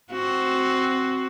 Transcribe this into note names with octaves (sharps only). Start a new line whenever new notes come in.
C4 F#4